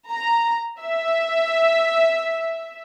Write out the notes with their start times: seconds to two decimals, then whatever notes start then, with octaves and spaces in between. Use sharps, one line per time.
0.11 A#5
0.81 E5